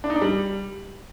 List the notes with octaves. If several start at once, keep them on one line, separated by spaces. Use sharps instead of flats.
D4
D#4
D4
G3